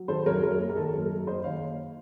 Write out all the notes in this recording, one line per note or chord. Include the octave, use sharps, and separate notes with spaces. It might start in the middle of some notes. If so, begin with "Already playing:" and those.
Already playing: F#3
D#3 A4 C5
F#2 A#4 C#5
F#2 A#4
A#3
A#4
D#3 A4
F#2 A#4
F#2
A#3 C5 D#5
D#3 C#5 F5